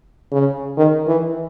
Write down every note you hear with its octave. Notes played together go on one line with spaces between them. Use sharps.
C#3
D#3
E3